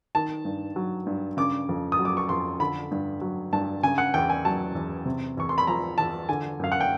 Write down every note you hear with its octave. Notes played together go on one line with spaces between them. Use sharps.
D#3 A5
G2
F#3
G2
C#3 D6
F2
D#6
F#3
D6
C#6
F2 C6
D3 B5
G2
F#3
G2 A5
C#3 G#5
F#5
E2 G5
G#5
F#3 A5
E2
C3
E2 C#6
C6
B5
F3 A#5
E2 A5
D3 G#5
F#2 F5
F#5
G5